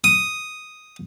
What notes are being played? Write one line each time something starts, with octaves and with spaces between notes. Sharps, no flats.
D#6